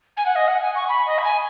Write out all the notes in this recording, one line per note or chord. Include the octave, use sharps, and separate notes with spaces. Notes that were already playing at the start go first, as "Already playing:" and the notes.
G#5
F#5
D#5
F#5
G#5
C#6
B5
D#5
B5
G#5